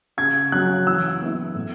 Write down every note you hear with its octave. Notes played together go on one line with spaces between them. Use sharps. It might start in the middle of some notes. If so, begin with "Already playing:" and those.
C#3 G#6
F#3 C#4 F#6
E3 E6
B3 E4
A2